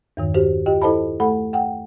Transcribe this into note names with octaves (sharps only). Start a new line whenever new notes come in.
E2 G2 D#3
F#4 G4 C5
F4 G4 D#5 G5
E4 A4 C5 D#5 A5 B5
A3 A4 F#5 B5
F#5 G5